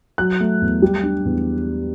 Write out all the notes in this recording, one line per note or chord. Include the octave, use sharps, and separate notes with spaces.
F#3 F#6
A3
E2
G3
D4
E2